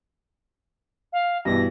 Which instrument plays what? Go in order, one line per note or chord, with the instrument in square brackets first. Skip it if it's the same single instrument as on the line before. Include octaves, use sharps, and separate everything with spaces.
[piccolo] F5
[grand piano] G2 B2 E3 [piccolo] A#6